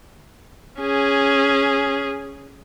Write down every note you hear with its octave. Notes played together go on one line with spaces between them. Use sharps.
C#4 G#4